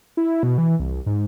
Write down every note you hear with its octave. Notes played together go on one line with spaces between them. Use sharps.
E4
B2
E3
C2
G#2